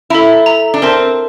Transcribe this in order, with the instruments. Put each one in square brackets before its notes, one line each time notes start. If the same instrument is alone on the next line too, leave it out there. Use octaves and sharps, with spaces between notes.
[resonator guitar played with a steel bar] E4 [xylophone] A4 E5 A#5
[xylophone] A4 E5 A#5
[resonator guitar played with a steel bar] D4
[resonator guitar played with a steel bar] C4 [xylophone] A#4 E5 A5 C6